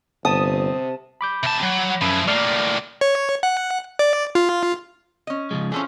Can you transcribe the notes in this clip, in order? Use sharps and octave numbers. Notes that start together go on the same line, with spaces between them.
G1 C3 A5 D#6
B5 D6 G6
C3 A5
F#3
F#2 F3 E4 B5
A2 A#3 D5 F6 C7
C#5
F#5
D5
F4
C#4 D#5
C#3 F3 G#3
E3 F3 C#4 G#4 A4